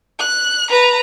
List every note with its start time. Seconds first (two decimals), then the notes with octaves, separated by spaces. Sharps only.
0.19 F#6
0.69 B4 A#5